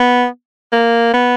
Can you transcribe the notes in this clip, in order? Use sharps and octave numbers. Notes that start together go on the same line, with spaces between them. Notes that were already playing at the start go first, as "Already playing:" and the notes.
Already playing: B3
A#3
B3